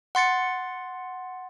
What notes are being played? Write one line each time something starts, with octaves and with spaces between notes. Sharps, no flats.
F#5 C6 A6 C#7